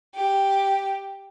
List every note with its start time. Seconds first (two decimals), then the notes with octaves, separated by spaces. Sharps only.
0.15 G4